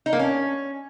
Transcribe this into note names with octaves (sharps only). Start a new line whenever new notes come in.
D#4
A#3
C#4